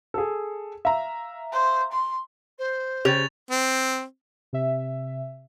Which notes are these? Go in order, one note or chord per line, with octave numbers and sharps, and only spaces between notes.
G#4 A4
E5 F5 A#5
C5
C6
C5
C#3 G4 A6 F7
C4
C3 E5